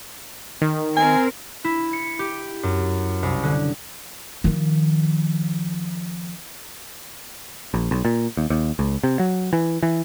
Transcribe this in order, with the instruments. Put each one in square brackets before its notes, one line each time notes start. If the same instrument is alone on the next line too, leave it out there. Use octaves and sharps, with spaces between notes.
[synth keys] D#3
[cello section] C4 A#4 [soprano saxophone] G#5
[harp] E4
C#7
G4
F#2
C2
D3
[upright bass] D#3 F3
[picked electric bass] A#1
B1
A#2
D#2
D#2
C#2
C3
F#3
E3
E3